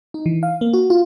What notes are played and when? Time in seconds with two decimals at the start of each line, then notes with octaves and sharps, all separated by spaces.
0.14 D#4
0.26 E3
0.43 F5
0.61 A#3
0.73 F#4
0.90 F4